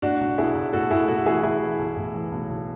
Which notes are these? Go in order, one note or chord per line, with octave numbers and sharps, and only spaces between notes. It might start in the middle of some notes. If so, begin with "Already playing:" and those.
A2 D4 F#4
B1
B1 E4 G#4
B1
A2 F#4 A4
A2 E4 G#4
B1 F#4 A4
E3 E4 G#4
B1 E4 G#4
E3
B1
A2
E3
B1
B1